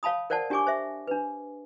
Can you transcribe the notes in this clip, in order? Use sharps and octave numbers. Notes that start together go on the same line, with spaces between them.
C#5 F5 A5 B5 D#6
A#4 C5 D5 F#5 A5
D4 G4 C#5 G#5 C#6 D6
C5 E5
D4 B4